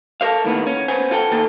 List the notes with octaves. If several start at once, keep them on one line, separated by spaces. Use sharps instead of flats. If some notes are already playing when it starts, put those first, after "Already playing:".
A4 A#4 C5 F5
A2 D#3 A#3 B3
C#4
B3 C5 G#5
F4 A4 G5
D#3 A#3 F4 A4